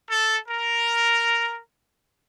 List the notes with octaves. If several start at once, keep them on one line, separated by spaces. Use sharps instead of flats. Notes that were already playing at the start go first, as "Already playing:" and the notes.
A4
A#4